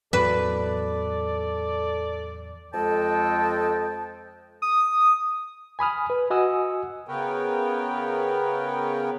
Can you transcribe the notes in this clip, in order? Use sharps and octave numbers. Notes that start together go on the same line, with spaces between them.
E2 A2 F#3 A4 B4 D5
F2 G#3 A4 D#5 G5 A5
D#6
G#5 B5 D#6 F6
B4
F#4 D#5 F#5 G#5 D#6 E6
C#3 B3 A#4 B4 C#5 G5